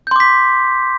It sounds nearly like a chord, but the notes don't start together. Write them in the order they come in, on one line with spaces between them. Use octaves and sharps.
G6 C6 D6 B6